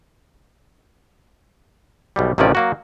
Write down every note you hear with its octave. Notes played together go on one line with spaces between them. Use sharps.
B1 B2 G3
A1 C3 D#3 F3 C#4 D5
F#3 A#3 F#4